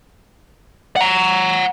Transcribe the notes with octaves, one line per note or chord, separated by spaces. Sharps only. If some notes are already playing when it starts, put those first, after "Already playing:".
F#5 A#5